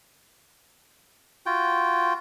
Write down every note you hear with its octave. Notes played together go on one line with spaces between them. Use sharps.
F4 F#4 G5